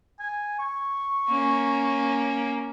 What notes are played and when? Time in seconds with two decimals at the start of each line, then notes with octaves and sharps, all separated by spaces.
0.19 G#5
0.59 C#6
1.28 A#3 C#4